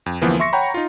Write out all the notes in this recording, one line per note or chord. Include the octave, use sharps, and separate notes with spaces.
F2
D2 E3 F3 A#3 B3
E5 C6 C#6 A#6 C#7
C#5 F#5 G5 A#5 B5 C#6
D#4 F4